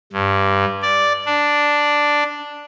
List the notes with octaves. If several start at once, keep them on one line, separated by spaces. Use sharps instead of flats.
G2
D5
D4